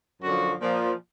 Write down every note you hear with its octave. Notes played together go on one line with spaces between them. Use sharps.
F#2 D3 F3 F#4
A#2 F3